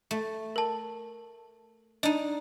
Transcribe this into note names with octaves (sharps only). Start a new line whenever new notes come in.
A3
A#4 A5
D4 D#4 D#5